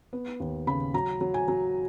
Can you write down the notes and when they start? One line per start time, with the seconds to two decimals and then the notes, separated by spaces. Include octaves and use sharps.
0.13 B3
0.40 D#2
0.67 C#3 B5
0.94 F#3 A#5
1.21 F#3
1.34 G#5
1.48 F#3